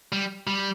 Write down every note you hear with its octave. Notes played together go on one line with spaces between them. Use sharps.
G3
G3